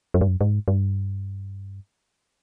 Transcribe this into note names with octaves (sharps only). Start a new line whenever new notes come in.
F#2
G2
F#2
G#2
G2